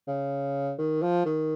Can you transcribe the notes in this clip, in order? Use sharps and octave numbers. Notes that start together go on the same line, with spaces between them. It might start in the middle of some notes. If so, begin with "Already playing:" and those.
C#3
D#3
F3
D#3